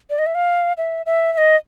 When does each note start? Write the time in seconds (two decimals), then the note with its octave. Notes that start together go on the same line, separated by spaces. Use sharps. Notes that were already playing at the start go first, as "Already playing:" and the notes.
0.10 D5
0.19 D#5
0.26 E5
0.35 F5
0.78 E5
1.06 E5
1.33 E5
1.38 D#5